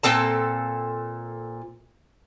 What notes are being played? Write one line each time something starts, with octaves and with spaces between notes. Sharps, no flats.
A#2 C4 A4 A5